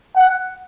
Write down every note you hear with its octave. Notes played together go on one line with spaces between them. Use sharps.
F#5